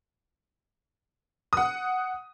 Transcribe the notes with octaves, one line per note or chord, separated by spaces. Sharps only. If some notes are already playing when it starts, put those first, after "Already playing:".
F#5 D#6